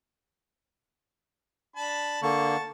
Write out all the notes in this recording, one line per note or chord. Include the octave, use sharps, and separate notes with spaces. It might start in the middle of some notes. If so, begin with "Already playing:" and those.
D4 A5 B5
D3 A#3 A5 C#6